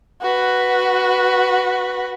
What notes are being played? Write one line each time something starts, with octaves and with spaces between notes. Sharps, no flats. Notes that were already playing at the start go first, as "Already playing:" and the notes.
F#4 B4